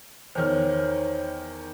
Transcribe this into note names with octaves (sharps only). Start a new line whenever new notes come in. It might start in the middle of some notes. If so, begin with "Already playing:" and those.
E2 D#3 C5 C#5 F6